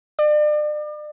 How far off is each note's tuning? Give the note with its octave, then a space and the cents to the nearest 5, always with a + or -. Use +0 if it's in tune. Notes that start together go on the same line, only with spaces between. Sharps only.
D5 +35